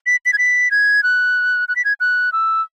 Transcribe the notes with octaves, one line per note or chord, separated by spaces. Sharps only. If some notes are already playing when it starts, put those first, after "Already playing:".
B6
B6
G#6
B6
G#6
F#6
F#6
B6
G#6
F#6
E6